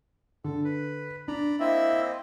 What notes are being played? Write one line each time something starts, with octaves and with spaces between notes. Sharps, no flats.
D3 A4
B4
D4 D5 A#5 B5
A#3 C4 E4 D#5 E5